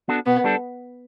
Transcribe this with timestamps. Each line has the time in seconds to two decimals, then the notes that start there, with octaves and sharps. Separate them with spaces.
0.08 B3 D4 F#4 A4
0.26 B2 B3
0.44 G3 D4 A4